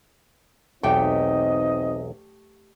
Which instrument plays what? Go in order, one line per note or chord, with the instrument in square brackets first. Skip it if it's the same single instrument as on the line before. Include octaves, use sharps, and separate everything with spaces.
[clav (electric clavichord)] B1 E2 [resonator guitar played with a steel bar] A3 G4 G5 [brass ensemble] C4 D#4 D#5